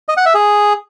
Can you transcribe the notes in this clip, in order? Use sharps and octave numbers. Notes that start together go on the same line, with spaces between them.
D#5
F#5
E5
G#4